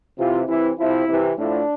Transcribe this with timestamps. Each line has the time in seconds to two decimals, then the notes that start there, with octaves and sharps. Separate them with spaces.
0.18 C3 E3 F4
0.47 C3 E3 E4
0.78 C3 F3 E4
1.08 C3 E3
1.37 A2 F3 D4